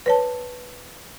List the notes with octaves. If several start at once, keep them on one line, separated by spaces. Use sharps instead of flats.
B4 C#5 A5